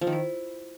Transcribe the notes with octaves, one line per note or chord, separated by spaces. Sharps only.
F3
D#3
E4